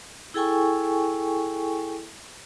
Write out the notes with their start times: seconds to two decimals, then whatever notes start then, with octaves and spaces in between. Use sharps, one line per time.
0.34 E4 G#4 A4 G5 G#5 C#6